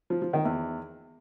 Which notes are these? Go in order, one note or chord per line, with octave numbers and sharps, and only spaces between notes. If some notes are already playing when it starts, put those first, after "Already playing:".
F3
F3
D#3
E2